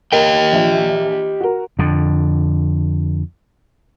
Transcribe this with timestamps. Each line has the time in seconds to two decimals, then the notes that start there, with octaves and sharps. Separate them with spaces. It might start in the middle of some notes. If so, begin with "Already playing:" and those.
0.12 G4 A#4 D#5 G5
0.53 A#1 F3 E5
1.40 F#4 A#4
1.79 F2 D3